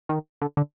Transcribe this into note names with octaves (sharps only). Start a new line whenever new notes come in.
D#3
D3
D3